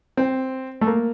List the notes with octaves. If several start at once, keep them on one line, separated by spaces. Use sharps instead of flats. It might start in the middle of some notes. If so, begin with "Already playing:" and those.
C4
A3
A#3